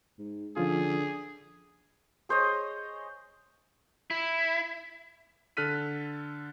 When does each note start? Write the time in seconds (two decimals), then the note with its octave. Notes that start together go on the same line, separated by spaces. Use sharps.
0.19 G#2
0.57 D3 F3 C#4 F4 G#4
2.29 G#4 C5 C#5 D#5
4.11 E4
5.57 D3 A4 F6 F#6 B6 D#7